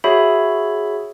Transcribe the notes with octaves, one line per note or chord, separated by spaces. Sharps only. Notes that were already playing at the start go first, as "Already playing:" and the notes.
F#4 G#4 C#5 E5 B5